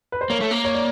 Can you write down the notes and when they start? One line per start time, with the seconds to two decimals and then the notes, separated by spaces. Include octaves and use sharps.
0.12 B4
0.21 C5
0.30 A#3 C#5
0.41 A3
0.51 A#3
0.64 C#5
0.74 D5